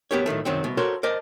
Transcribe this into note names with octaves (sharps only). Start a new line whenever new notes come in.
F#3 B3 D#4 G4 A#4 C#5
B1 A2 D#3 A3
C2 F#2 D#3 F#3 C4
C2 B2
F#4 A4 A#4 C5 C#5
A#4 C5 D5 D#5 A5